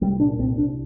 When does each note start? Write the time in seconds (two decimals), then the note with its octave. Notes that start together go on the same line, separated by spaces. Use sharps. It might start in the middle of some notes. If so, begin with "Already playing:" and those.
0.01 C2 G3
0.20 A#2 D4
0.39 C2 C4
0.58 C2 D4